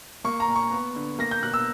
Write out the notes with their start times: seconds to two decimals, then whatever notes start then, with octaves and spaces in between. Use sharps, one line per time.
0.24 A#3 C#6
0.40 A#5
0.48 A#2
0.55 C#6
0.71 B3
0.96 D3
1.19 A#3 A#6
1.31 G6
1.43 B2 F#6
1.54 E6